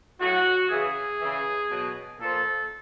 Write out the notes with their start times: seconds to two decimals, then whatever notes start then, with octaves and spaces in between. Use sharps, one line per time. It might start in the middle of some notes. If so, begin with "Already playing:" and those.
0.20 A2 F#3 F#4
0.69 C#3 E3 G#4
1.20 C#3 E3
1.69 B2 F#3
2.20 A#2 F3 A4